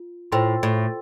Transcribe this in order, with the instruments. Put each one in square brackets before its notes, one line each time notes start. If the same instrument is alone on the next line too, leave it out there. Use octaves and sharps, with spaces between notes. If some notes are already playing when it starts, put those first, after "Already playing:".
Already playing: [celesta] F4
[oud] A2 [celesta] F4 C5 G5 C6
[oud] A2